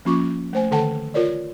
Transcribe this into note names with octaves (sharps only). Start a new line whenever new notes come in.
F3 A#3 C#4 F4 C#6 D6
A3 C5 G#5
D3 D#3 A4 F#5 G5 A5
F4 A#4 C#5 D5